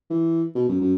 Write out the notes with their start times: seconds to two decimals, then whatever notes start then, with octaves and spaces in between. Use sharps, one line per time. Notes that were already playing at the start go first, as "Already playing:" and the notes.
0.10 E3
0.55 B2
0.69 F#2
0.81 F#2